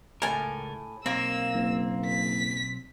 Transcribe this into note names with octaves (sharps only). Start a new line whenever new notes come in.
C#2 A2 A4 A#4 G#5
B1 A#3 C4 E6
F#1
B6